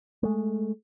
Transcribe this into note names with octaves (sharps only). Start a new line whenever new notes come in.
G#3 A3